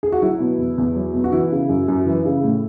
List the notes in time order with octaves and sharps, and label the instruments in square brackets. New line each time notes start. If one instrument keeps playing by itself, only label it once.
[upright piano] G#4
F#4
F#3 E4
B2
E2
E2
F#3
B2
F#4
E3 E4
C#3
F#2
F#2
E3
C#3
A2